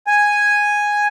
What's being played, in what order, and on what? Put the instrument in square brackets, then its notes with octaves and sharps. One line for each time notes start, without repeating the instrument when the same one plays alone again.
[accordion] G#5